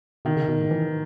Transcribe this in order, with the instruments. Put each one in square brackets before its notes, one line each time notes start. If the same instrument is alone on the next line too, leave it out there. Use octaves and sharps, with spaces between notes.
[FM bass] B2 [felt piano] D#3
[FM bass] C#3
B2
A2
E3